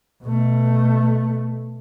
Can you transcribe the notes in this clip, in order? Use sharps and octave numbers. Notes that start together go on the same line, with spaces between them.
B2 A3